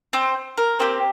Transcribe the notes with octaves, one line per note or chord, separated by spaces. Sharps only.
C4 C5
A#4
A#3 C4 G4 C5